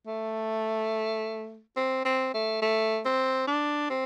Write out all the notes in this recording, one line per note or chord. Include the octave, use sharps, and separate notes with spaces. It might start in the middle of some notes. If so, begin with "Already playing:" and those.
A3
C4
C4
A3
A3
C4
D4
C4